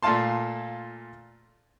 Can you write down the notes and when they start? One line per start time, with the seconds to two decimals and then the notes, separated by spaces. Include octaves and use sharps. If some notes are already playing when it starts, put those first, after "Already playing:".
0.03 A#2 A3 F4 F5 A5 C6